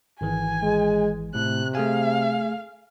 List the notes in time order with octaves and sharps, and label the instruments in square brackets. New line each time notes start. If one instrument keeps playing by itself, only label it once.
[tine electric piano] G#1 E3 [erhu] G#5
[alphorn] G#3
[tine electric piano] A2 [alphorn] C3 [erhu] F#6
[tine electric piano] A3 G#4 G#5 [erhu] F5